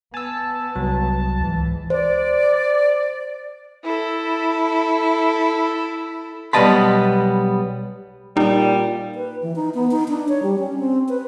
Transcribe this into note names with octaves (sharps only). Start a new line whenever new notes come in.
B3 G#5 A5 E6
C2 F#3
C#2 G#2 E3
C5 D5
E4 A4
B1 G3 B3 D#5 A5 B5
A#2 G3 D#4
B4
E3
D#4
B3
D#4
D4
C#5
G3
C#4
C4
B4